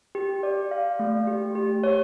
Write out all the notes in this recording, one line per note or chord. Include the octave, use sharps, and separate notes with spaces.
G4
D5
F5
A3
G4
G4
C#5